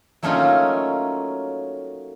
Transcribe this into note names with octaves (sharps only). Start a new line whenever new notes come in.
F#3 A3 A#3 C#4 D#4 F4